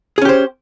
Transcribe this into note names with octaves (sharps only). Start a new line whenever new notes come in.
C#4 G4 G#4 C5